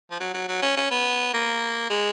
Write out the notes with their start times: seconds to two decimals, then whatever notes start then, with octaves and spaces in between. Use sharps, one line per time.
0.11 F3
0.20 F#3
0.34 F#3
0.48 F#3
0.62 C#4
0.77 C#4
0.91 B3
1.34 A#3
1.90 G#3